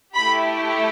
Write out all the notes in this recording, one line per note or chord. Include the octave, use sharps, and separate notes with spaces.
A3 E4 G4 B5